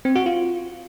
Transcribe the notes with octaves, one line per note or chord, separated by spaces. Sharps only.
C4
F#4
F4